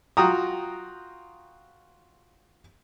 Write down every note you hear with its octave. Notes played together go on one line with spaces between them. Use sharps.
F4 F#4 G5 A#5 D#6